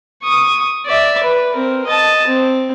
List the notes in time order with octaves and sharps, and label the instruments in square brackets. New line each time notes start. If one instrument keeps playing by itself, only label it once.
[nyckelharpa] C#6 D#6
D5 E5
B4
C4 A#4
D#5 A5
C4